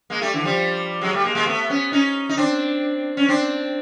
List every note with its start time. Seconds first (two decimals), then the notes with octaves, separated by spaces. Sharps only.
0.10 G#3 A#3
0.21 G3 A3
0.34 D3 E3
0.44 F3 G3
1.01 F#3 G#3
1.12 G3 A3
1.24 G#3 A#3
1.35 G#3 A#3
1.46 A3 B3
1.69 B3 C#4
1.92 C#4 D#4
2.29 D#4
2.37 C4 D4
3.17 C#4
3.28 C4 D4